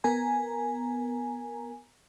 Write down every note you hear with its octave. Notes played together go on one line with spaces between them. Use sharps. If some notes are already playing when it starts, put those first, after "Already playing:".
B3 A#4 G#5 A#5